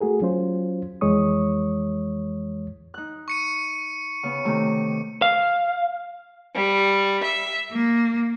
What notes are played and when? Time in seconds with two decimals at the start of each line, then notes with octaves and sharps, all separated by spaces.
0.01 A3 F#4 G#4 A#4
0.22 F#3 C#4 F4 C5
1.01 F2 E3 G#3 C#5 C#6 D#6
2.94 D#4 F#6
3.28 C#6 C#7 D#7
4.23 C#3 B3
4.45 C3 D#3 A3
5.22 F5
6.55 G3
7.22 E5
7.72 A#3